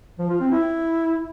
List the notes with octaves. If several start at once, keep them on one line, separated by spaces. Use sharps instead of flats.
F3
F4
C4
E4